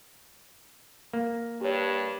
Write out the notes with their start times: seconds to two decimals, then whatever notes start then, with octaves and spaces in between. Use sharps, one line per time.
1.13 A#3
1.61 G2 G4 C#5